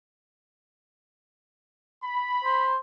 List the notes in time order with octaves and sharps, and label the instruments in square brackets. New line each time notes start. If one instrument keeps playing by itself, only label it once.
[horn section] B5
[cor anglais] C5